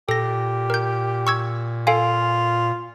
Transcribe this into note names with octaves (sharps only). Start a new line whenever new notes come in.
A#2 G4 A4 A#6
A#4 G6
C#6 E6 G#6
F4 A4 F5 G#5